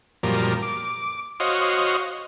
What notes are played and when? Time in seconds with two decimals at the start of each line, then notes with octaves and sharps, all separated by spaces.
0.23 F#2 A#2 F3 G3 A#4
0.63 D6
1.40 F#4 C5 C#5 D#5 F5